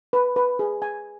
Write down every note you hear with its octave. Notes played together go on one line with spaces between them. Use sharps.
B4
B4
G#4
G#5